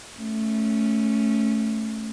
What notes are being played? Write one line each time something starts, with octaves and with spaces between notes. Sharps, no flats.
A3 C#4